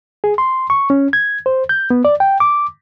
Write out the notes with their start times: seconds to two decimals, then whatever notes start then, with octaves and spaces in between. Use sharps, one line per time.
0.24 G#4
0.38 C6
0.70 C#6
0.90 C#4
1.13 G#6
1.46 C5
1.69 G6
1.90 B3
2.05 D5
2.20 G5
2.40 D6